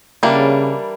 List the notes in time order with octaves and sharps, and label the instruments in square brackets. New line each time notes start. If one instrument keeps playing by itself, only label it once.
[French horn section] C#3 [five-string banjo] E3 G3 A#3 D4